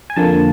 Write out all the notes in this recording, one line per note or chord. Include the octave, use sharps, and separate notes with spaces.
G#5
F2 D3 F3 A#3 A5